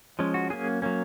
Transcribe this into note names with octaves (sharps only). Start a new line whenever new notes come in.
F3 G#3 C#4
F#4
F#3 A#3 C#4 G#4
F#3 A#3 C#4